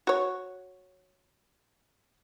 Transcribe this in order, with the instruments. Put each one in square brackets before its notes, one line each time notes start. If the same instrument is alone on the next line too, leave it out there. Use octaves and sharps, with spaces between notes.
[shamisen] F#4 C#5